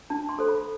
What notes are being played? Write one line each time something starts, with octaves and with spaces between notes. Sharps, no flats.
D4 A5
C6
A4 C5
B5